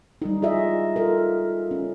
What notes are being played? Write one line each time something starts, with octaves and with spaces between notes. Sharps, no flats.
G3 D#4
F4 G#4 D#5 E5
F4 A4 A#4
C#4